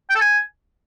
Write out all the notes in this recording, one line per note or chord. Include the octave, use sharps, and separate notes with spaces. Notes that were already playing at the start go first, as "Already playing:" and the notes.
G5
A4
G#5